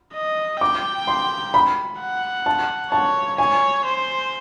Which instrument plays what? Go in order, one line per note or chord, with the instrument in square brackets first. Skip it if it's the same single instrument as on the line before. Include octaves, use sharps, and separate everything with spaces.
[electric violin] D#5
[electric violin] G5 [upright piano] D6
[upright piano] C6
B5
[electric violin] F#5
[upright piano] A5
[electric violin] C#5 [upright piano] A5
[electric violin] C#5 [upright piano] G#5
[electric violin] C5